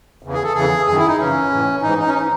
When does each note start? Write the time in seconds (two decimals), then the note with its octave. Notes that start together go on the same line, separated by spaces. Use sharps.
0.23 E2 C#3 E3
0.33 G#4
0.43 A4
0.54 E2 C#3 E3 G#4
0.86 F#2 D#3 G#4
0.97 E4
1.07 D#4
1.18 F#2 C#3 E3 C#4
1.50 A2 E3
1.82 G#2 E3 D#4
1.98 D#4
2.06 C#4
2.14 D#4
2.18 E3